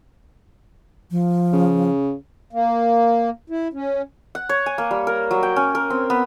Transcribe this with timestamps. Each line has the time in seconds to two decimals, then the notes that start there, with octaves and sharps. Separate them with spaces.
1.11 F3
1.53 C#3
2.53 A#3
3.50 E4
3.73 C#4
4.35 F#5
4.49 C#5
4.66 G#5
4.78 A#3
4.91 G3
5.07 A#4
5.31 F#3
5.43 G5
5.56 C#4
5.75 A#4
5.90 C4
6.10 B3